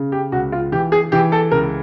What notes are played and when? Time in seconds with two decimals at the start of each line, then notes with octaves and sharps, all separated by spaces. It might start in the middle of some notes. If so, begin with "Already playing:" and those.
Already playing: C#3
0.12 G4
0.32 C#2 F#4
0.52 F4
0.72 E3 G4
0.92 G#4
1.12 E3 G4
1.32 A4
1.51 C#2 A#4